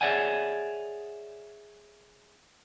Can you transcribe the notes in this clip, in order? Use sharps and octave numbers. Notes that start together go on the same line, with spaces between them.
G#4 C#5 D5 E5 F#5 G#5